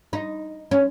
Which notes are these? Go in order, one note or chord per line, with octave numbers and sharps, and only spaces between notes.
D#4
C#4